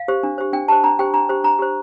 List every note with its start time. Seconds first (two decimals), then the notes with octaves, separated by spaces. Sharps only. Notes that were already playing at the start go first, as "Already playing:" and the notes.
Already playing: F5
0.08 G4 C5
0.23 D4
0.38 G4 C5
0.53 D4 G5
0.68 G4 C5 A5
0.84 D4 A#5
0.99 G4 C5 G5
1.14 D4 A#5
1.29 G4 C5
1.44 D4 A#5
1.59 G4 C5